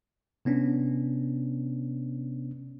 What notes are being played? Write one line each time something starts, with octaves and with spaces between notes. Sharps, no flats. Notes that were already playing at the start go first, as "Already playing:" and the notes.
C3 B3 C#4 D4